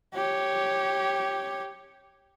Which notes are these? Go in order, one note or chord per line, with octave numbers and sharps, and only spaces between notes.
G4 C#5